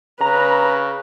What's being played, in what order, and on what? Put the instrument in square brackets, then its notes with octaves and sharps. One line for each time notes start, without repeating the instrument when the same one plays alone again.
[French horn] C#3 [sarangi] B4 [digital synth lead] A#5